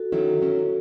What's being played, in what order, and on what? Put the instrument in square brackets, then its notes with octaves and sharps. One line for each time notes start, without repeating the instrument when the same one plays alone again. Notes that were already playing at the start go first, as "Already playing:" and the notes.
Already playing: [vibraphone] F#4 A4
[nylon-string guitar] D#3 F#3 C#4 E4
D#3 F#3 C#4 E4